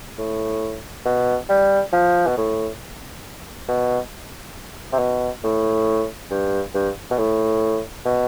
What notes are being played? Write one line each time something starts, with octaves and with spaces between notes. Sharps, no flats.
A2
B2
G3
F3
B2
A2
B2
C3
B2
A2
G2
G2
B2
A2
B2